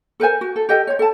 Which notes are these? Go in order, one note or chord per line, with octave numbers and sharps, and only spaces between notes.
A4 A#4 C5 G#5
F#4
A4
G4 A4 D#5 G5
C5 C#5
A4 A5